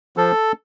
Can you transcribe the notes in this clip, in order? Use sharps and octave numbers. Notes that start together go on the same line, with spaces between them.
F3 A4